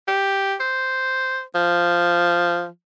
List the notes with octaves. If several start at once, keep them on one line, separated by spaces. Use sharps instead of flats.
G4
C5
F3